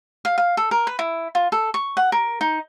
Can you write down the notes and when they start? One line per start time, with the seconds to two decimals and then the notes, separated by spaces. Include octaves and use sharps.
0.25 F5
0.38 F5
0.57 A4
0.71 A#4
0.87 B4
0.99 E4
1.35 F4
1.52 A4
1.74 C#6
1.97 F#5
2.12 A#4
2.41 D#4